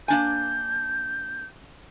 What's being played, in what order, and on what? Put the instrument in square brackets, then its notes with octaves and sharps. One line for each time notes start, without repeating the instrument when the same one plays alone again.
[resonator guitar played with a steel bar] A#3 D4 G#5 [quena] G6